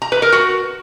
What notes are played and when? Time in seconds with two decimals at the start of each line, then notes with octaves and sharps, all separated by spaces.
0.02 A#5
0.12 B4
0.22 A#4
0.32 F#4